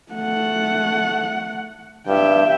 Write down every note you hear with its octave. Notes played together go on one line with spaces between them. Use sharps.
A3 F#5
G2 E5 G5